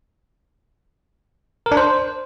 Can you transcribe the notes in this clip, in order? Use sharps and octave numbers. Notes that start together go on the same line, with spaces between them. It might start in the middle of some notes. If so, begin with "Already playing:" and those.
A#4
D4
C5